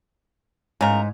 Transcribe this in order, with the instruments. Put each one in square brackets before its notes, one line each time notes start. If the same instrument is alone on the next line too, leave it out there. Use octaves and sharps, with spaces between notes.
[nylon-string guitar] G#2 [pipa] C#3 A#4